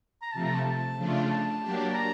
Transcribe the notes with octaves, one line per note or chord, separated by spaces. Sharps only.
A#5
C3 F3 A3 A5
A#5
A5
A5
C#3 F3 A3 D4 F4
A5
F#3 A#3 D4 G4
A#5